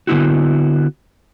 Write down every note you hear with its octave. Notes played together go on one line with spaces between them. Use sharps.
D3 B3 E4 F#4